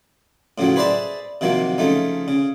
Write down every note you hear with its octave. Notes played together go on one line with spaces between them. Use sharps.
A2 C#3 F3 F#3
G#4 B4 C5 D5 E5 A5
C3 D#3 F3 F#3 A#3
C#3 F3 A3 D#4
C#3